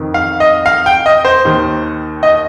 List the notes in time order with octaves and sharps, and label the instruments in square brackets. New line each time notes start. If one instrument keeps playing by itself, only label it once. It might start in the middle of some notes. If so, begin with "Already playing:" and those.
Already playing: [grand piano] F2 D#3
F5
D#5
F5
G5
D#5
C5
D#2 D#3
D#5